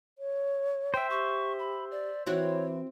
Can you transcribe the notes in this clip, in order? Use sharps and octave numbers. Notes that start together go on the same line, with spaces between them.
C#5
C5 E5 G5
G4 C#6
B5
D5
E3 C4 E4 F#4 C#5